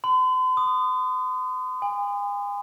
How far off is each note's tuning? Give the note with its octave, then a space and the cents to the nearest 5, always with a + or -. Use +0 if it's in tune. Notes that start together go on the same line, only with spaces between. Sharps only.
C6 -45
D#6 -25
G#5 -40